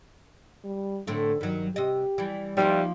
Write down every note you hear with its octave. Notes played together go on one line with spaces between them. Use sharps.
G3
A2 D3 A3 C4
G2 D#3 F#3
C3 G4 D#5
E3 G3
F3 G3 A#3 D#4 F4